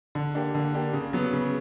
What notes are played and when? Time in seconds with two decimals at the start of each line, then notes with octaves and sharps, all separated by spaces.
0.15 D3
0.35 A#3 D4 G4
0.55 D3
0.74 A#3 D4 G4
0.93 C#3
1.13 F#3 B3
1.33 C#3